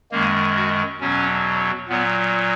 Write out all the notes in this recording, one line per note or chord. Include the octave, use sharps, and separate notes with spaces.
F#2 D#3 G#3 A#3
F#4
E2 B2 F#3 C#4
A#2 F#3 B3